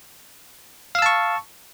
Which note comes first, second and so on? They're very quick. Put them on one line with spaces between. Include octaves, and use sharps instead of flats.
F5 E6 A5 C#6